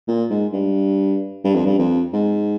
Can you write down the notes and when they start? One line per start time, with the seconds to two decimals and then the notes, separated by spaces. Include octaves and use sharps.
0.08 A#2
0.30 G#2
0.53 G2
1.45 G2
1.55 F2
1.65 G2
1.78 F2
2.13 G#2